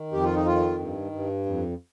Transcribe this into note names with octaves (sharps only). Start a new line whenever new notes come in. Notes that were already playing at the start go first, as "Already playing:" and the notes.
Already playing: D#3
F2 G4
F4
D#4
D#3 F4
G2
G2
F2